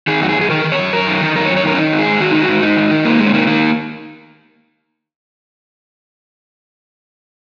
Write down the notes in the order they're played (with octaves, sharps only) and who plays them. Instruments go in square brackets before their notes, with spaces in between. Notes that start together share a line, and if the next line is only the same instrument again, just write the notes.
[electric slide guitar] D#3 G#4
F#2 F#4
G#4
F#2
G#4
D#3 A#4
D#3
C#5
F#2
F#2 A#4
D#3
D#3
F#2 A#4
C#5
F#2
C#5
D#3 A#4
C#4
D#3 D#4
G#2
G#4
G#2
D#3 F#4
D#3 D#4
F#4
G#2
G#2 D#4
D#3
D#3
G#2 A#3
G#2 G#3
C#4
D#3 A#3
D#3 A#3